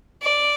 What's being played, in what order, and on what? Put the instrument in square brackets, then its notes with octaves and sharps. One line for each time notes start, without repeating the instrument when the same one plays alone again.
[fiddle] D5